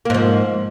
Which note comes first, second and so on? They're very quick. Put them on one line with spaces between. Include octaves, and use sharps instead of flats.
A#3 G#2 F3